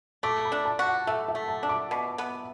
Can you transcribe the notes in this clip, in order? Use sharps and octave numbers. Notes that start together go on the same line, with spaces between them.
A3 D6
B5
D4
A5
F#4
F#5
A3 E5
E5
A3
A5
D4
D6
B2
B3